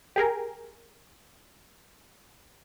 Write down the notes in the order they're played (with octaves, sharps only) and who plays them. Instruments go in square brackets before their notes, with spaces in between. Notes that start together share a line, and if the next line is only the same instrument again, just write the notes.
[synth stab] G4 G#4 A#4